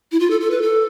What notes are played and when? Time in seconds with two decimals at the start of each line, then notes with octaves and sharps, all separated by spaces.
0.12 E4
0.20 F4
0.30 A4
0.41 A4
0.51 B4
0.62 A4